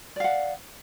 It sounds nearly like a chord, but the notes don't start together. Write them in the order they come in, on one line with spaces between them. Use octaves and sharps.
D5 F5 F#5